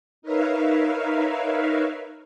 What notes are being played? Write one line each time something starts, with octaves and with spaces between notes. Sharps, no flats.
D#4 A#4 B4 C#5 E5 F5